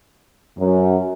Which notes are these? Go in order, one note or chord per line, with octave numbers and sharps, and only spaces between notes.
F#2